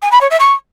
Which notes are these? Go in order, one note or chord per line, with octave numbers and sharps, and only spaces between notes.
G#5
B5
C#5
E5
C#6